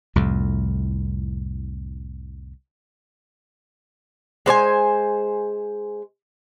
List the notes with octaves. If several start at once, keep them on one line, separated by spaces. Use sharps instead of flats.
C2 F2 A2
G#3 C5 D5 G#5